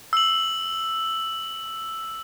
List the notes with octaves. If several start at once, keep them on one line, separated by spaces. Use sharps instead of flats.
E6 F#7